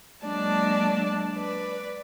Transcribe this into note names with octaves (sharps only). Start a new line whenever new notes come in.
F#3 G#3 A#3 D4 D5 A5
B4 D5